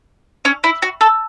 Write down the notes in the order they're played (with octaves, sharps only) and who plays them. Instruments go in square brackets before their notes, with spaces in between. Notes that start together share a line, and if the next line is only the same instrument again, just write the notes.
[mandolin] C#4
E4
F#4
A4